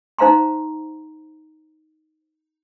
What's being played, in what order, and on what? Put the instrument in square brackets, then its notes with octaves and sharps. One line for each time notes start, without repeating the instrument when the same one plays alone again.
[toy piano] D#4 C5 F5 A#5 C6